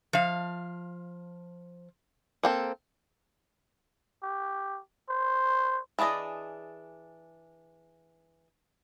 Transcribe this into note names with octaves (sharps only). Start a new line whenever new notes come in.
F3 F5
A#3 C4 A4
G4
C5
E3 D4 G#4 D5 D#5